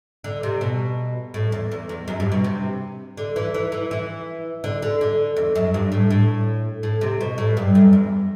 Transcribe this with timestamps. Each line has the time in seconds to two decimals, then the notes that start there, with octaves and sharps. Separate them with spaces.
0.24 D3
0.43 C3
0.61 B2
1.34 A2
1.52 E2
1.71 E2
1.89 E2
2.08 F#2
2.20 G2
2.32 B2
2.44 C3
3.17 D3
3.36 E3
3.54 E3
3.72 E3
3.91 E3
4.64 D3
4.82 D3
5.01 D3
5.36 E2
5.55 F#2
5.74 G2
5.92 A2
6.10 A2
6.83 A2
7.01 C3
7.21 B2
7.38 A2
7.57 G2
7.75 F#2
7.93 E2